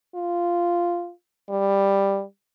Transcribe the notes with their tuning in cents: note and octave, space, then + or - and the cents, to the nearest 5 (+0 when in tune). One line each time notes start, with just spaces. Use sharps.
F4 -5
G3 +10